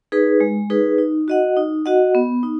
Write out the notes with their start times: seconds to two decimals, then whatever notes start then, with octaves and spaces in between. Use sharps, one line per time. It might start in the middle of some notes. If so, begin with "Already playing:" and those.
0.12 D#4 G#4 B4
0.40 G#3
0.70 D#4 G#4 B4
0.98 D#4
1.28 F#4 D#5 F#5
1.57 D#4
1.86 F#4 D#5 F#5
2.15 B3
2.43 D#4